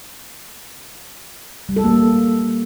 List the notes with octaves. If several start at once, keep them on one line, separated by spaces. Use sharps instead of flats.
G3
A4
A#3